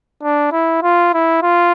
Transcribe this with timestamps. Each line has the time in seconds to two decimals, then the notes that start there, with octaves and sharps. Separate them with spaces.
0.23 D4
0.52 E4
0.83 F4
1.14 E4
1.43 F4